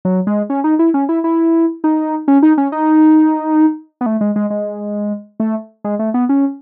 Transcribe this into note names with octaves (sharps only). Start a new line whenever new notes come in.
F#3
G#3
C#4
D#4
E4
C#4
E4
E4
D#4
C#4
D#4
C#4
D#4
B3
A3
G#3
G#3
G#3
A3
G#3
A3
B3
C#4